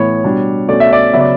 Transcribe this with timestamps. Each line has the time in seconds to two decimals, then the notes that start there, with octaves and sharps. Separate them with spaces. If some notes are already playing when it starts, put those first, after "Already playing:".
Already playing: A2 E3 B3 C#5
0.24 B2 G3 D4
0.68 B2 A3 C#4 D5
0.80 E5
0.93 D5
1.13 C#3 F#3 B3 E5
1.21 D5